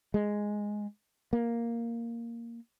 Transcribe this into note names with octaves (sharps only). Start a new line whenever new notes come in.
G#3
A#3